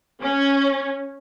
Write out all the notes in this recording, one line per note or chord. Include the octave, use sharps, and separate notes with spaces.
C#4